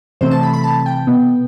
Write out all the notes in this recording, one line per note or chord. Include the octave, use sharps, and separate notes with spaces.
C3 E3 A3 C4 C5
A5
B5
B5
A5
G5
B2 B3